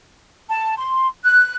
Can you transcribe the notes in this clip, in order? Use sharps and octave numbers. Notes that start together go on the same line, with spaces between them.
A5
C6
F#6